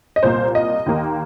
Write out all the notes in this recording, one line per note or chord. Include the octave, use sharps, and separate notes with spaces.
D#5
C2 A#2 A#3 C5
D#5
D#2 D#3 A#3